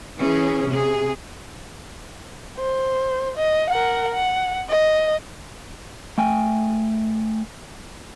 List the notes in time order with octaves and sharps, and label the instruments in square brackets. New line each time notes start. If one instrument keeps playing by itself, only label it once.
[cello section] E3 C#4 G#4
C3 G#4
[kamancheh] C5
D#5
A#4 F#5
F#5
D#5
[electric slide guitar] A3 G5 G#5